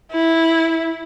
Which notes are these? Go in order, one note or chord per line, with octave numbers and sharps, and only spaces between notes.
E4